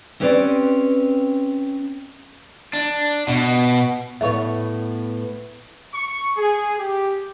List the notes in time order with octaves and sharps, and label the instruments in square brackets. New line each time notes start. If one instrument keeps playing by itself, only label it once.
[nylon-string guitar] C4 C#4 G4 B4 C5 D5
[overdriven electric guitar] D4
B2
[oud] A2 B3 C#5 [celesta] E5
[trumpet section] C#6
G#4
G4